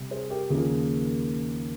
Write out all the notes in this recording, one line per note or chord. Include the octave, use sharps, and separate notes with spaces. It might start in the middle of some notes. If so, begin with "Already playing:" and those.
Already playing: C3 G3
G#4 C5
G4 A#4
D#2 C#3 F3 A#3 G#4